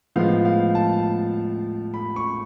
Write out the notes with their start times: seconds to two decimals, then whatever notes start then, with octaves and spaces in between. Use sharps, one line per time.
0.16 A2 F3 G#3 B3 F5
0.45 F5
0.75 A5
1.94 B5
2.16 C#6